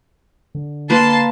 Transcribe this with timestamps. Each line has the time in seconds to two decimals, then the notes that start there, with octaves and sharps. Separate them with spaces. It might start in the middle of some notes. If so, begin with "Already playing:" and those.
0.55 D3
0.90 A#3 B4 A5 C6